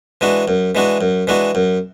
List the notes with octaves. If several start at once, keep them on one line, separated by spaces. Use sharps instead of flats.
E3 G#3 D4 F#4
F#2
E3 G#3 D4 F#4
F#2
E3 G#3 D4 F#4
F#2